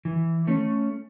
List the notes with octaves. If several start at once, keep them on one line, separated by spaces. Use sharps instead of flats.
E3
A3 C#4